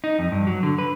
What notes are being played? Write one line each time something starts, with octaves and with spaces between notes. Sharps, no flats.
D#4
F2
G2
F#3
D3
B4